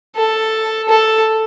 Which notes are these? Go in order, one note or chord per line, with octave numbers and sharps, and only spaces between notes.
A4
A4